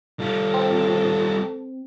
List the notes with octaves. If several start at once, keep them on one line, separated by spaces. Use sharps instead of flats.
G3 F4 A4
C4